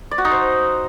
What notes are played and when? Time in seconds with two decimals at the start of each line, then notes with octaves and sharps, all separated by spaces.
0.11 D5
0.18 F#4
0.25 D#4
0.31 C5